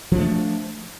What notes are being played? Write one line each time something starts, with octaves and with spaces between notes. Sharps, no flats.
F3 A3 D4